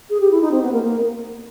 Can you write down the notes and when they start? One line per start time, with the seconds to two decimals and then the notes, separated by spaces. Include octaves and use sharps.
0.10 G#4
0.20 G4
0.31 E4
0.41 D#4
0.51 C4
0.62 B3
0.72 A#3
0.83 A#3